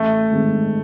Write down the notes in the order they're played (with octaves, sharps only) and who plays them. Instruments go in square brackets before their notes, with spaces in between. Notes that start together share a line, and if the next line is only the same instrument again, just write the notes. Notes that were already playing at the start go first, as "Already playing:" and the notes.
Already playing: [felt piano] A1 [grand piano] A3
[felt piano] G#2 D#3 G#3 C4